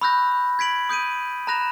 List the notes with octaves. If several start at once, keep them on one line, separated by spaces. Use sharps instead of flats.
B5 C#6 E6 F#6 G6 A#6
G#6 B6 D7 F#7
D#6 G6 D7 D#7
A#5 B5 F#6 A#6 E7 F7